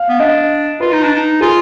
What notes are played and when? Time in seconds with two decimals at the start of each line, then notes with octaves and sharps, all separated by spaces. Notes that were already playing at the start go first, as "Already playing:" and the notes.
Already playing: F5
0.09 B3
0.20 D4 D#5
0.80 F4 B4
0.92 D#4
1.04 D4
1.15 D#4
1.41 F4 G#4